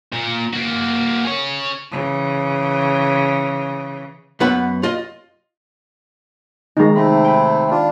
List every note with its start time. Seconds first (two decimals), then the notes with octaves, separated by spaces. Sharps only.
0.13 A#2
0.53 A#3 F#4
1.25 G#4 C#5
1.91 C#3 E3
4.40 F#2 B3 B4 E5 F#5 B5
4.83 F4 D#5
6.77 D#3 G#3 D#4 F5 A#6
6.95 C3 A3 C4 B5
7.24 G5 G#5 B5
7.71 D4 F4